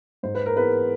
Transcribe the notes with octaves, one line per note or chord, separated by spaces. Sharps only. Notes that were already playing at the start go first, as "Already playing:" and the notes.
G#2 C5
B4
A#4
E3 G#3 B3 B4